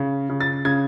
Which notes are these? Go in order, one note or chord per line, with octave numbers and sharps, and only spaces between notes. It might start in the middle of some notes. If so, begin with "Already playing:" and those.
Already playing: C#3
C#3
A6
C#3 G#6